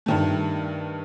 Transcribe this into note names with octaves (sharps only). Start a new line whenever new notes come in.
G2 D#3 A3